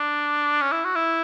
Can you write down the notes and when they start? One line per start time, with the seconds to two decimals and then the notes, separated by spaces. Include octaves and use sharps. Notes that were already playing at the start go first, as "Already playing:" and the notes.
Already playing: D4
0.61 C#4
0.72 E4
0.84 F#4
0.95 E4